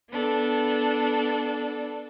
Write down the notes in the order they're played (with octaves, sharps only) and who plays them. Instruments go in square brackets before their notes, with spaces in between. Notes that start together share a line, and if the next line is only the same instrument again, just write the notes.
[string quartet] B3 D4 A4